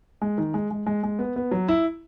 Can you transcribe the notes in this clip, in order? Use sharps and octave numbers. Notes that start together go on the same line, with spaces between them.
G#3
D#3
G#3
G#3
G#3
G#3
B3
B3
F#3
E4